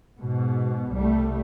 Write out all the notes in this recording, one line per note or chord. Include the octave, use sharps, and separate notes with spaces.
G#2 B2
C2 G3 A3